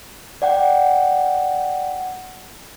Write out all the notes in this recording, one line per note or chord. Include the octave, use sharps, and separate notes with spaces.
D5 F#5 G5